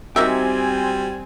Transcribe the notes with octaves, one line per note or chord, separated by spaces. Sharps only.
G3 C4 D#4 F#4 G4 A#4 E5 G#5